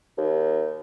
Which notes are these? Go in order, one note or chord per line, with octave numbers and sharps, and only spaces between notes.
D#2